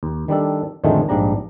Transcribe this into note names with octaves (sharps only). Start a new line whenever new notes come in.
D#2
D#3 G3 D4 A4
F2 A2 D3 D#3 G#3 A3
A#1 G#2 G3 D4 A#5